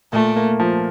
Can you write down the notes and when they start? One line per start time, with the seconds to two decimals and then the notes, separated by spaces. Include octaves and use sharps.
0.12 A#2 A3
0.36 A#3
0.60 F3